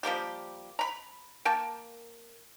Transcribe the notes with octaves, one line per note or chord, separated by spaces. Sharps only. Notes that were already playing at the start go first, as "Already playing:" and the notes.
F3 G3 A#3 G4
A#5 B5
A#3 G5 A5